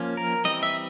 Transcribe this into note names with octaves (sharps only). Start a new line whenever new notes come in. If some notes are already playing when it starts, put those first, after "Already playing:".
Already playing: F3 A#3 C#4
A#4
E3 G3 C4 D#5
E5